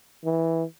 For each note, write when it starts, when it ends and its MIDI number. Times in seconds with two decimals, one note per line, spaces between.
0.25 0.64 52